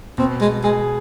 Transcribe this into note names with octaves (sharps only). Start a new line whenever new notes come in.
B2 C4
G#3
G#3 G#4